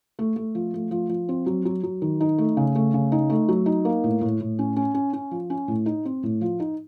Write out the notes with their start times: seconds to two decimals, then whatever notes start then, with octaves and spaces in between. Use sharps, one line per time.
0.19 A3
0.36 A3
0.55 F3
0.74 A3
0.91 F3
1.09 F3
1.29 C4
1.46 F#3
1.65 F#3
1.83 F#3
2.02 D#3
2.21 D#4
2.38 A3
2.57 C#3
2.75 A3
2.94 C#3
3.12 D#4
3.30 A3
3.49 F#3
3.66 D#4
3.85 A#3
4.04 A2
4.21 A2
4.40 A2
4.59 C#4
4.76 C#4
4.94 C#4
5.13 C#4
5.31 F3
5.50 C#4
5.68 A2
5.86 D#4
6.05 C4
6.23 A2
6.41 F3
6.60 D#4